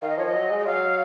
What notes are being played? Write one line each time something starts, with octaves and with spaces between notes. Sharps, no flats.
D#3 F5
D#5
F3 C#5
D#5
F#3
G#3
D#5
F#3 F5